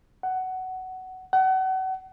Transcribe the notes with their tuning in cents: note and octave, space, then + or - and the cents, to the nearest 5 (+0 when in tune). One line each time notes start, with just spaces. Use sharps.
F#5 +15
F#5 +35